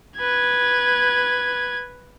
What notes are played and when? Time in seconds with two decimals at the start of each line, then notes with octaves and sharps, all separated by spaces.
0.19 B4 G#6